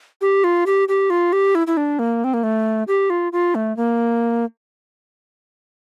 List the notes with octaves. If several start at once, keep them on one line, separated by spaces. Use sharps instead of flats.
G4
F4
G4
G4
F4
G4
E4
E4
D4
A#3
C4
A#3
A3
G4
F4
F4
A3
A#3